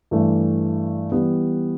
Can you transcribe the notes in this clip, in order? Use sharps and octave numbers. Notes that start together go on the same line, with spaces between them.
G2 E3 A3
E3 G3 B3